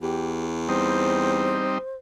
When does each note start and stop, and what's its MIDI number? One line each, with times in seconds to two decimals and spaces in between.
0.02 1.77 40
0.02 0.46 67
0.69 1.78 55
0.69 1.78 60
0.69 1.78 63
0.69 1.97 72